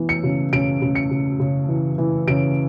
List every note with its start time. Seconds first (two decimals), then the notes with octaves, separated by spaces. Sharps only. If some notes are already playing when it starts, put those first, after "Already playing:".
Already playing: E3 B3
0.09 C#7
0.23 C#3
0.53 C#3 D7
0.82 C#3
0.95 C#7
1.11 C#3
1.40 C#3
1.68 E3
1.98 E3
2.28 C#3 D7